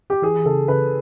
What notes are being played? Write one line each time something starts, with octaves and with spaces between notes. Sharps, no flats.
G4
E3 G#4
C#3 A4
C#3 B4